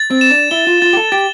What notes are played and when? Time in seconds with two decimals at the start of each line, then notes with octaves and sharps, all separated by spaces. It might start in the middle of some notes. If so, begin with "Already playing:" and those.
Already playing: A6
0.11 C4
0.21 E7
0.30 D4
0.51 E4 G7
0.67 F4
0.82 F4 A6
0.93 G4
0.97 A4
1.12 G4 A6